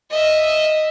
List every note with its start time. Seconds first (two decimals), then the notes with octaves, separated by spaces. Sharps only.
0.10 D#5 E5